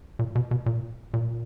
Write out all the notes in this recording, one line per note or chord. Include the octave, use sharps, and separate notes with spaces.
A#2
B2
B2
A#2
A#2